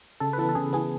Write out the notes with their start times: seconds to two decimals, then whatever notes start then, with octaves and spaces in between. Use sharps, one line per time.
0.20 C#3 A4
0.33 B4
0.38 E3 B3 A4
0.49 A4
0.55 C#3 G#4
0.73 E3 B3 G#4